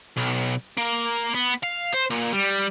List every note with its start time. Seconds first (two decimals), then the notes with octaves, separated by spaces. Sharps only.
0.17 B1
0.78 A#3
1.34 B3
1.63 F5
1.93 C5
2.10 A#2
2.33 G3